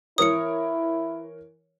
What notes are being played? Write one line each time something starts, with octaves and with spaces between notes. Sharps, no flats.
E3 E4 A#4 C#5 D#6 C#7